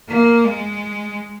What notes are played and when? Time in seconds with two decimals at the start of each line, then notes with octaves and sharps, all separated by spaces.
0.08 A#3
0.44 G#3